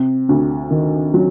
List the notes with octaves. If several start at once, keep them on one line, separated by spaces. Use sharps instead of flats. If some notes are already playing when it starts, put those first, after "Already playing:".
Already playing: C3
D2
D#3
F#3